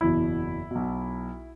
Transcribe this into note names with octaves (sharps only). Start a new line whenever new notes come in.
F#1 E2 B2 E4
B1 B2